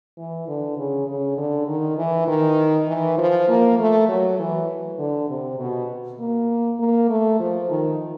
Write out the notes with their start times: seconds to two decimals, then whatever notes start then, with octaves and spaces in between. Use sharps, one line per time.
0.18 E3
0.48 D3
0.77 C#3
1.07 C#3
1.37 D3
1.68 D#3
1.98 E3
2.28 D#3
2.87 E3
3.18 F3
3.49 A#3
3.79 A3
4.08 F#3
4.39 E3
4.99 D3
5.30 C3
5.59 B2
6.20 A#3
6.80 A#3
7.10 A3
7.40 F3
7.70 D#3